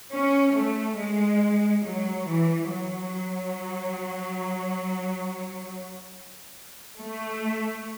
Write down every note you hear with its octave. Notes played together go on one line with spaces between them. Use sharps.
C#4
A3
G#3
F#3
E3
F#3
A3